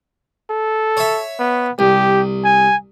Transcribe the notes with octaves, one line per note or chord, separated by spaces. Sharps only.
A4
C#5 E5
B3
C2 G4
G#5